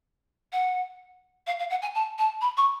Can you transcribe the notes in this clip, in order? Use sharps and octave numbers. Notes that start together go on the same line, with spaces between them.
F#5
F5
F5
F#5
G#5
A5
A5
B5
C#6